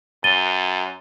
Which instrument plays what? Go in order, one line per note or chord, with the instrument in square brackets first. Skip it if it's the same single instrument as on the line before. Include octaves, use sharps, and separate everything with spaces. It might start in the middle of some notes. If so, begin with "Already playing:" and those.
[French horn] F#2 [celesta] A6 D#7 G7